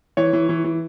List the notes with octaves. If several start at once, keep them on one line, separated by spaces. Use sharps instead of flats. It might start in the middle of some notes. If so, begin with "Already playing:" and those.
E3 C#5
E3
E3
E3